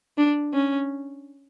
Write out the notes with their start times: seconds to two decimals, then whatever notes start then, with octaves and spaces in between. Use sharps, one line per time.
0.18 D4
0.53 C#4